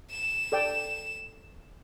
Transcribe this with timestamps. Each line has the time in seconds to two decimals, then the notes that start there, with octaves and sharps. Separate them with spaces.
0.11 E7
0.52 A4 D5 G5